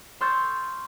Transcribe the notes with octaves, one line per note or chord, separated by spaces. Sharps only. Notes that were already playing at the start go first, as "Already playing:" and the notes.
C6 C#6 E6 F6 G6 A6